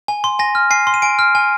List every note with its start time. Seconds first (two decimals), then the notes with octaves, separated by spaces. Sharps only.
0.08 G#5
0.24 C6
0.39 G#5 A#6
0.55 F6
0.71 G#5 C7
0.87 C6
0.94 D#7
1.02 G#5 D7
1.19 F6
1.35 G#5